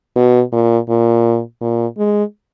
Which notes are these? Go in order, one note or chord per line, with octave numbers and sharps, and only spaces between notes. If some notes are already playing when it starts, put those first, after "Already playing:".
B2
A#2
A#2
A#2
G#3